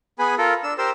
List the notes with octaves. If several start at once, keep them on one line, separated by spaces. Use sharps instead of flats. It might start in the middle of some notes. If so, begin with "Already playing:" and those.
B3 G#4 B4 G#5 B5
F4 A4 A#4
D4 E6
G4 A#4 C5 E6